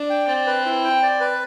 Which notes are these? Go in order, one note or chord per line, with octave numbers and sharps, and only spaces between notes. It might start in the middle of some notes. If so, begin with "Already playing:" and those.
Already playing: D4
G5
C4 D5
B4
E4
G5
D5
B4